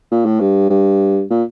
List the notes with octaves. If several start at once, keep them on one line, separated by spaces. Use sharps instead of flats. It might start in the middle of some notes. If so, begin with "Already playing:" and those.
A#2
A2
G2
G2
A#2